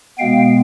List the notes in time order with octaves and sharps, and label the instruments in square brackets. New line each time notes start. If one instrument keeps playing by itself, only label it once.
[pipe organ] B2 G#3 B3 F5 G5